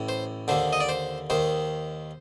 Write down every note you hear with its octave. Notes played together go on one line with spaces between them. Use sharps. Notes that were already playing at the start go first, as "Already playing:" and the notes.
Already playing: A1 A2
C5
D#2 D3 C5
D#5
D5
C5
D#2 D#3 C5